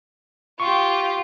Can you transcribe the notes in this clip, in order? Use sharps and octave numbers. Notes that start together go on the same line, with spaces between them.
F4 G4 C#6